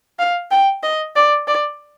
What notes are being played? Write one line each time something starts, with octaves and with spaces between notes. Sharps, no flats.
F5
G5
D#5
D5
D5